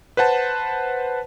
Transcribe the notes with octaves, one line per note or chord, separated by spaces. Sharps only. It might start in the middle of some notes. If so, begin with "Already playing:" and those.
B4 C5 F#5 A5